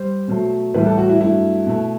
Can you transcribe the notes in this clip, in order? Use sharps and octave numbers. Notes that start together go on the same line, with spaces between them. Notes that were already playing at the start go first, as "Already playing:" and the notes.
Already playing: G3 C5
B2 F#3 A3
A2 E3 G3 B4
A4
F#4
E4
G2 F#3 A3 E4
B2 A3